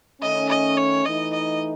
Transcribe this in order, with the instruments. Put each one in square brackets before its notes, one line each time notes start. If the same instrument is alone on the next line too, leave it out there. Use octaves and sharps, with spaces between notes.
[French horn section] D#3 A3 C#4 [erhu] D#5
[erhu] D#5
C#5
[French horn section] E3 A3 D#4 [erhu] D#5
[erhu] D#5